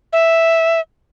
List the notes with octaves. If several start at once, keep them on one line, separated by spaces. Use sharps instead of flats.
E5